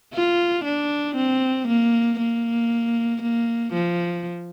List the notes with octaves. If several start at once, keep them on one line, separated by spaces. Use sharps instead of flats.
F4
D4
C4
A#3
A#3
A#3
F3